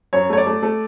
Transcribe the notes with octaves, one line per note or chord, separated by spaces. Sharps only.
F#2 C#5
A3 C#5
D5
A3
A3